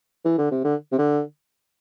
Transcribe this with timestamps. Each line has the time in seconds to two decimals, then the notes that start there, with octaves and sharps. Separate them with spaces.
0.25 E3
0.38 D3
0.51 C3
0.64 D3
0.92 C3
0.98 D3